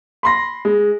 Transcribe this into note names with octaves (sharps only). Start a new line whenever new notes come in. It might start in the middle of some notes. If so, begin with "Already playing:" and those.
B5 C6 A#6
G#3